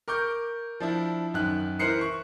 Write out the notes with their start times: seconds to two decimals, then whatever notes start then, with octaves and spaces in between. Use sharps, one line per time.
0.08 A#4 C#6 D6 G6
0.80 F3 D4 E4
1.34 F#2 D#3 F#6
1.79 E3 A#4 C5 F#6 C7 C#7
2.01 C#6